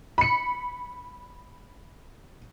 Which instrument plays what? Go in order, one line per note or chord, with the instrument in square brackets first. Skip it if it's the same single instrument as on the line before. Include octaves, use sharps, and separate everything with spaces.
[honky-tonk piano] B5 C#7